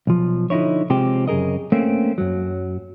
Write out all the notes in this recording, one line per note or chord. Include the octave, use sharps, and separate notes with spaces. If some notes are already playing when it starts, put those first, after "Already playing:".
B1 F3
D3 F3 D#4 E4 C#5
C3 F3 G#3 C4 G4
F#2 C#3 G#4 A#4 D#5
A3 A#3 C4 C#4
F#2 F#3